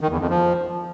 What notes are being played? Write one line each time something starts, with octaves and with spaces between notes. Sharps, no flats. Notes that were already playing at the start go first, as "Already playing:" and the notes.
D#3
E2
F2
F3